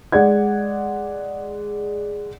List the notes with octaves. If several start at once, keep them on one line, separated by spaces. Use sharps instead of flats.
G#3 D5 F#5 G#6